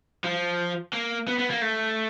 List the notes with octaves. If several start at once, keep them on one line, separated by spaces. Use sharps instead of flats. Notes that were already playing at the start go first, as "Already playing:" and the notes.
F3
A#3
B3
B3
A#3
A3